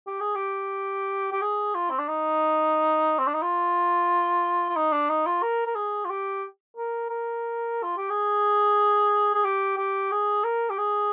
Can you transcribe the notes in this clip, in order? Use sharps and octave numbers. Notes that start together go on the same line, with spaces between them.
G4
G#4
G4
G4
G#4
F4
C4
D4
D#4
C4
D4
D#4
F4
F4
D#4
D4
D#4
F4
A#4
A#4
G#4
F4
G4
A#4
A#4
F4
G4
G#4
G#4
G4
G4
G#4
A#4
G4
G#4